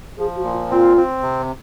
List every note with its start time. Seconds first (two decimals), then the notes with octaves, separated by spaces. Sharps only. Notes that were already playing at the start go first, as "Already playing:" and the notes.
0.18 F3 G#4
0.36 F#4
0.44 A#2
0.54 F4
0.70 C4 F4
0.97 C4
1.22 C3